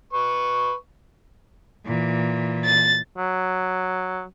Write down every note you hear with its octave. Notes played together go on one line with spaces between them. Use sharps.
B4 C#6
A#2 E3
A6
F#3